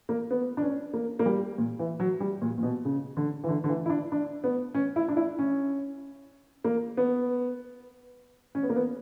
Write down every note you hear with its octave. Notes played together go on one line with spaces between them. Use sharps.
A#3
B3
D4
C#4
A#3
A#3
G3
A#2
E3
F#3
G3
A#2
A#2
B2
C#3
D3
E3
D3
D3
E3
E4
D4
D4
B3
C#4
E4
D4
E4
C#4
A#3
B3
C#4
B3
A#3
B3